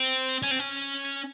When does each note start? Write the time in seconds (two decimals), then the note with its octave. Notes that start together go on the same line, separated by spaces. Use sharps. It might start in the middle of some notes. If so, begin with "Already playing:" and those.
Already playing: C4
0.43 C#4
0.51 C4
0.59 C#4